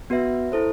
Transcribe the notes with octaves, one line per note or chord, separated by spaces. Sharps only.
B3 F#4 B4 E5
E4 A4 C5